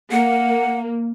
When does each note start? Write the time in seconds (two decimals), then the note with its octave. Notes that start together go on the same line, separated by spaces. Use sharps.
0.12 A#3 F#5